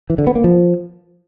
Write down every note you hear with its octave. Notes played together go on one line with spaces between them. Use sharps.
E3
D3
B3
A#3
F3